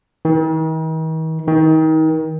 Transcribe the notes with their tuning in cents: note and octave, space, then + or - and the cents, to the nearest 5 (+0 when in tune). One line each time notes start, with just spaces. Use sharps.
D#3 +45
D#3 +30